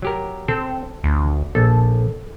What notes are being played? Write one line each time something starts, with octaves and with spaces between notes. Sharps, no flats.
F#3 G4 A#4
C4 A4
D2
A#1 A4